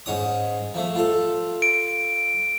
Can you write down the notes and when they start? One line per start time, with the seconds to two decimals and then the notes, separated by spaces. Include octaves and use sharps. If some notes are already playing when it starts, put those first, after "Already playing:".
0.06 G#2 C#4 D#6
0.74 F3 A3
0.95 F4 A4
1.62 D7